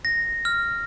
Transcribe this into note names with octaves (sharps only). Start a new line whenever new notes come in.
A#6
F6